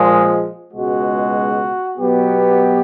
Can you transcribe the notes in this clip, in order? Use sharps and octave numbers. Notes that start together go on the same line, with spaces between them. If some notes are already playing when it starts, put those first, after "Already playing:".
Already playing: A#2 F3 G#3
C#2 B2 G#3 F#4
B2 F#3 B3 G4